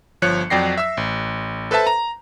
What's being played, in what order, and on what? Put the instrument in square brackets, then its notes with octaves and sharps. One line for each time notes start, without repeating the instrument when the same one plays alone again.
[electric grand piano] G1 F3 C#5 F#6 C#7
F2 F#3 D5 G5 A#6 C7
E5 E6
A1
A4 B4 C5 E5 A5
A#5